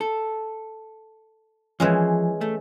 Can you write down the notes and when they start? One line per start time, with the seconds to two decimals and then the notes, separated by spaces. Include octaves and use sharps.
0.01 A4
1.80 E3 F3 G#3 C#4
2.41 A3